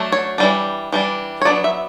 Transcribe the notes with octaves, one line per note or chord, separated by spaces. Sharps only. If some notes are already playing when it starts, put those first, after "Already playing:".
Already playing: F#3 A3 D4
C#5
E3 G3 D4
E3 G3 D4
C#5
F#3 B3 D4 D5
E5